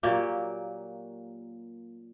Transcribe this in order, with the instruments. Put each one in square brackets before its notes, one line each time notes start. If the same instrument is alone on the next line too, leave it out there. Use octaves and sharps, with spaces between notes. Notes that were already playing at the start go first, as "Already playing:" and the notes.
[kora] A#2 F#3 A#3 G4